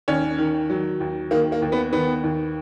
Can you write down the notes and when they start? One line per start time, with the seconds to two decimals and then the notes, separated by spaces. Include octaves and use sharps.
0.08 D#2 C#4
0.38 D#3
0.70 F#3
1.00 D#2
1.31 D#3 A#3
1.52 A#3
1.62 D#2
1.72 B3
1.93 D#3 B3
2.24 D#2